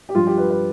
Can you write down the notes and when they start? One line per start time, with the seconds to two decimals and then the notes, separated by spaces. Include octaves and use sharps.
0.09 G4
0.15 G2 F3 F4
0.27 G4
0.38 B4
0.50 B4